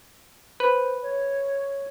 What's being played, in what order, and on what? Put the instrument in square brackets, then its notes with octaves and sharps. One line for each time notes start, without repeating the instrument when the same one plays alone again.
[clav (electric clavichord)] B4 [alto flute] C5
[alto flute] C#5